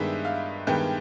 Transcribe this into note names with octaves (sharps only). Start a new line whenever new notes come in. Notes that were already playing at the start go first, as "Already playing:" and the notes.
Already playing: G2 D#3 G#3 B3 E5
F5
G2 D#3 G#3 B3 G5